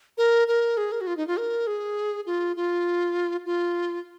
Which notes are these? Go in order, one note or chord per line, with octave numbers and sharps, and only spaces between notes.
A#4
A#4
G#4
A#4
F#4
F4
D#4
F4
A#4
G#4
F4
F4
F4